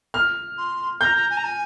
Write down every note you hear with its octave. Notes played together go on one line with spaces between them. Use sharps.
F6
C6
A#5 G6
A#5
G#5
A#5
G#5